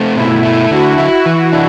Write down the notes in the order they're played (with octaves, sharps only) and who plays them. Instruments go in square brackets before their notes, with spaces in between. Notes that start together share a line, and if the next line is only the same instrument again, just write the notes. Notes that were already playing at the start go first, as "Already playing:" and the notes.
Already playing: [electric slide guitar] A3 C4
[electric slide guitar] B2 [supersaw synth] E4
[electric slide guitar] A3
[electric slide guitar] D3 [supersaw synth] F#4
[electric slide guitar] E4
E3
D4